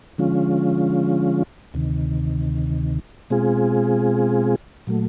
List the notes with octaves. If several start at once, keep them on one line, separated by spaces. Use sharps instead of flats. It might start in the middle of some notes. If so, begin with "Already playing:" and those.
D3 F3 G#3 C#4 F4
D2 C3 D#3
B2 G#3 C4 F4 G#4
A#2 F#3 A3